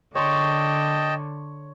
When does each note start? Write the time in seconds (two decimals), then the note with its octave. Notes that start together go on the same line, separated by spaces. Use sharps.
0.15 D3 C#5 D#5 G5 A5 C6